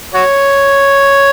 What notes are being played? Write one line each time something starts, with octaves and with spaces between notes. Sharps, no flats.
F#4 C#5